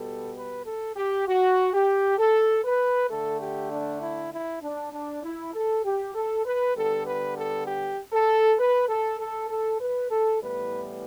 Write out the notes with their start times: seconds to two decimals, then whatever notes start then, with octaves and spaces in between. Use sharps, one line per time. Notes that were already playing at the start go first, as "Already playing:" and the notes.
Already playing: B2 G3 B3 A4
0.36 B4
0.66 A4
0.97 G4
1.28 F#4
1.74 G4
2.18 A4
2.65 B4
3.10 D3 A3 A4
3.41 G4
3.72 D4
4.02 E4
4.33 E4
4.62 D4
4.93 D4
5.23 E4
5.54 A4
5.84 G4
6.15 A4
6.46 B4
6.77 D3 G3 B3 A4
7.07 B4
7.37 A4
7.67 G4
8.13 A4
8.59 B4
8.89 A4
9.20 A4
9.50 A4
9.81 B4
10.11 A4
10.41 A2 E3 G3 B3 B4